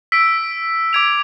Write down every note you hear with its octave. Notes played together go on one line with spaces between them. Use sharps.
E6 B6 D7
D6 G#6 D7 F7